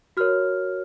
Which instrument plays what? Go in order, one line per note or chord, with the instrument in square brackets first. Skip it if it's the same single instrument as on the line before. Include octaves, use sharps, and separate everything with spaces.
[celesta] F#4 A#4 C#5 F6